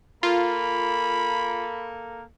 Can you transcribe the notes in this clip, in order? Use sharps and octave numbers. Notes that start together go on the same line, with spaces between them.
A#3 F4 A4 B5